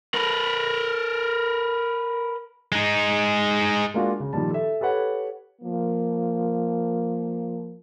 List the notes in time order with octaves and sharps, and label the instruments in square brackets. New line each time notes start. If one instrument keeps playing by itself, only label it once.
[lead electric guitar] A#4 B4
G#3 D#4
[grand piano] G#3 A#3 D4 F4 F#4
C#3
A#2 D#3 F3 G3 A5
A4 E5
G4 A4 B4 C#5 F#5
[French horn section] F3 A#3